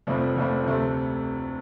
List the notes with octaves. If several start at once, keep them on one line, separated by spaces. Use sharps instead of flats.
F1 F2 F3 A3 C4
F1 F2 F3 A3 C4
D2 C3 A3 C4